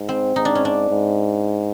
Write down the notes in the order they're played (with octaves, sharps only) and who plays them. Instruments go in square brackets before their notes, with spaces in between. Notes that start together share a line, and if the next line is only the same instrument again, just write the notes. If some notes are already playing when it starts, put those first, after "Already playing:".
Already playing: [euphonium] G#2
[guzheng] C4
[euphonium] G#2 [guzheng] D#4
[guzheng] D4
C#4
D4
[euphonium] G#2